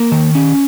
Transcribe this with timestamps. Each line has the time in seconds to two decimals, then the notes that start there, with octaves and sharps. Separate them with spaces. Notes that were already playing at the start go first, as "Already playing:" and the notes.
Already playing: A#3 A#4
0.12 D#3
0.35 C#4